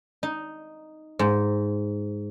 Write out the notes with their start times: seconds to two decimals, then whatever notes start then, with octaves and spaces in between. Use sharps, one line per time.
0.23 D#4
1.19 G#2